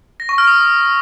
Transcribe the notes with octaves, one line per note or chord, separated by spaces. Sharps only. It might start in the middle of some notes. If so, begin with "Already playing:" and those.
A#6
C#6
F6
D#6